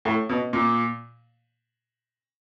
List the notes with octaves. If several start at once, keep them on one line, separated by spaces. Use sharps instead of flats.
A2
B2
A#2